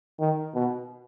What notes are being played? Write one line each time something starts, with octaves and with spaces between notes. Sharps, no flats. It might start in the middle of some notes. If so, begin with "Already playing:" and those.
D#3
B2